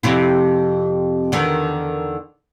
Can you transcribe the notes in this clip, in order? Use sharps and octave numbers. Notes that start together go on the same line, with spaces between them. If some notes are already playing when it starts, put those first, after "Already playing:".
F2 C3 E4
E2 D3 D#3